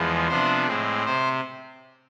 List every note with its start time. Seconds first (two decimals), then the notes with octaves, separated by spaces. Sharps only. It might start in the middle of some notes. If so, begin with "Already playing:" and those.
Already playing: E2 F3 G#3 B3
0.28 C3 F3 B3 D4 C5
0.67 A2 G#3 C4
1.05 C3 C5